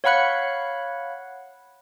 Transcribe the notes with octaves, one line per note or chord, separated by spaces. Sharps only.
C#5 F5 F#5 B5 F#6 C#7